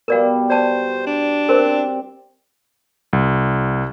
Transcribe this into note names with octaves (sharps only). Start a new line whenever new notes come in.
B2 G3 A#4 D5 F5
C5 D5 A5
D4
C4 A#4 C5 D5
C2